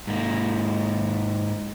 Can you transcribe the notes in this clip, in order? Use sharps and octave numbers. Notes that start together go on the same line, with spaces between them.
G#2 A#3